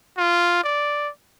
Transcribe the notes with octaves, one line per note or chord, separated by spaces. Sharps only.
F4
D5